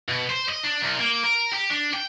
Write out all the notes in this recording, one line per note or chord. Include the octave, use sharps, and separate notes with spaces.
B2
C5
D#5
D4
C2
A#3
A#4
G4
D4
G5